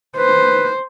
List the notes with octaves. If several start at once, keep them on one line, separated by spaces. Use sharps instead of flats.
B4 C5